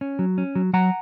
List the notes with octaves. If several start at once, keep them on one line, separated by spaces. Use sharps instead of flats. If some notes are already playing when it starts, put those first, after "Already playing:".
C#4
F#3
C#4
F#3
F#3 F#5 A#5